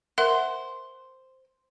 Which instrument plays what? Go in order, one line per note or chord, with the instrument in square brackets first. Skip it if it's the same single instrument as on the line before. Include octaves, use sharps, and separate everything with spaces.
[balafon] A#4 E5 F#5 [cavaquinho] C5